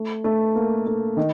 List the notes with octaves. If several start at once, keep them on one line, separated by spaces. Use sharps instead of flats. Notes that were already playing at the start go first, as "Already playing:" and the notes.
Already playing: A3
A3
A#3
A3
D#3